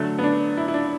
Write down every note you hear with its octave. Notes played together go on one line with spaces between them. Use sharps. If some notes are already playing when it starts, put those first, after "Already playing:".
Already playing: D3 F#3 A3
B3
D4
E4
E4
D4